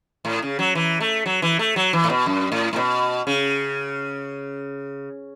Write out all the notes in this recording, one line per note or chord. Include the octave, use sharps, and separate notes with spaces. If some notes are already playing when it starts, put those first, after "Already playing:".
A2
C#3
F#3
E3
A3
F#3
E3
A3
F#3
E3
A2
B2
F#2
A2
A2
B2
C#3